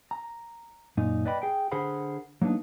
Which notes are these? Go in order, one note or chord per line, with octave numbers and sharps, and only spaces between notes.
A#5
F#2 A#2 D#4
B4 D5 D#5 G5 B5
G#4 G5
D3 G#4 A#4 C5 F#5 B5
F#3 A#3 B3 D4 D#4